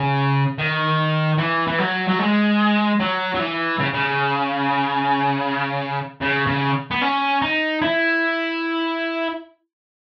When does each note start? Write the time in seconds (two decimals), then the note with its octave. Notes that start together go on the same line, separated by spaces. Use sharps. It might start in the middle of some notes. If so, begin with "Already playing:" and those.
Already playing: C#3
0.58 D#3
1.38 E3
1.68 E3
1.79 F#3
2.09 F#3
2.19 G#3
2.99 F#3
3.34 F#3
3.39 E3
3.79 C#3
3.94 C#3
6.21 C#3
6.47 C#3
6.91 B3
7.01 C#4
7.42 D#4
7.82 E4